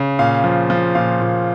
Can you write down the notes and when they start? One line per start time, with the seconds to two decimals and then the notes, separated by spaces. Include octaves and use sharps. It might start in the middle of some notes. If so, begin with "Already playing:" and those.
Already playing: C#3
0.19 A#2 F5
0.44 F3
0.70 F3
0.95 A#2 F5
1.21 A#2